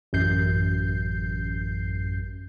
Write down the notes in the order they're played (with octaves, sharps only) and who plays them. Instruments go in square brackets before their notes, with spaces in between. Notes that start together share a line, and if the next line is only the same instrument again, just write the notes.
[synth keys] A1 F#2 G6 C7